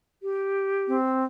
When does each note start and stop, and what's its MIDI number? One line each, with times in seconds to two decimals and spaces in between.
0.23 0.97 67
0.88 1.25 60